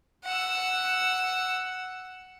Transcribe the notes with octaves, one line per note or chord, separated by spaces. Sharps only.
F#5 E6